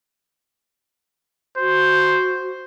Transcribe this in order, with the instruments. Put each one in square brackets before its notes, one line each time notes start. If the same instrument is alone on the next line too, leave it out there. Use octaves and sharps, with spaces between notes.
[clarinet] F#4 [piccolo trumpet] C5